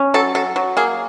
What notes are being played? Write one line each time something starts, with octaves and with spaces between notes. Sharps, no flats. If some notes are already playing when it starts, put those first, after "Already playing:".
Already playing: C#4
F#3 A4
F#3 A4
F#3
A#3 G#4